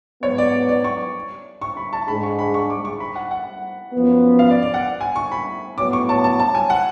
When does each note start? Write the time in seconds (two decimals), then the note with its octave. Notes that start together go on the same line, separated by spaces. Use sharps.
0.23 G#2 F#3 B3 C#5
0.38 D5
0.69 D5
0.84 C#6
1.62 C#6
1.77 B5
1.93 A5
2.08 G#2 G#3 D4 G#4 B5
2.23 C#6
2.39 B5
2.54 C#6
2.70 D6
2.85 C#6
3.00 B5
3.15 F#5
3.31 F#5
3.93 F#2 F3 B3
4.39 F5
4.50 D5
4.62 D5
4.74 F#5
5.01 G#5
5.16 C#6
5.32 B5
5.78 A2 F#3 B3 F#4 C#5 D6
5.93 C#6
6.09 A5
6.24 A5
6.39 A5
6.55 G#5
6.70 F#5